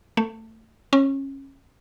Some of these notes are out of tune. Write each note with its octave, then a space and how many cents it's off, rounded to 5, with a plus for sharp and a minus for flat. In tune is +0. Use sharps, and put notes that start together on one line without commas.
A3 +25
C#4 -20